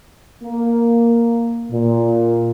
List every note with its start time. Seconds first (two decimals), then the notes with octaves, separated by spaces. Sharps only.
0.43 A#3
1.70 A#2